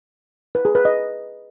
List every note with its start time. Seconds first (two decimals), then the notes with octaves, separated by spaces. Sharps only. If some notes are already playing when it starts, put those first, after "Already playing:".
0.55 B4
0.65 G#4
0.75 B4
0.85 D#5